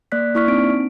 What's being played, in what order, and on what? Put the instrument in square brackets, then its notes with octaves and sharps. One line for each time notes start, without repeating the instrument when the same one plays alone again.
[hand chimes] A#3 D5 F#6 B6
A#3 E4 D5 C#6 F6 B6
C4 D4 D#4 D7